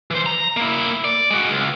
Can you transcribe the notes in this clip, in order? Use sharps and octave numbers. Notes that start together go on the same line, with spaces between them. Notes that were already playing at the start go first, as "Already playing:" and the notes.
E3 C5
A#5
A#3 E4
D5
G#3 F#4
C#2